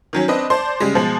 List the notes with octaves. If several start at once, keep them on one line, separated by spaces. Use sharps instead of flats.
D#3 F#3 C#4
C4 D4 B4 D#5
C5 D5 A5 C6
C#3 G3 G#3
B2 F3 G#3